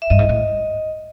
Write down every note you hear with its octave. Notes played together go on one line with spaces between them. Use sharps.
E5
G2 D#5
G#2
A2